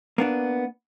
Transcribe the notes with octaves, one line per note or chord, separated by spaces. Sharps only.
A#3 B3 D4